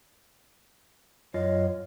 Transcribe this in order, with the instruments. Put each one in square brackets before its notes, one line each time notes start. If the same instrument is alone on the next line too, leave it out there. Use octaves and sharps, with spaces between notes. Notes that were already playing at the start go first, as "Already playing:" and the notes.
[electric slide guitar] F#2 F4 D#5 [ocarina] C#5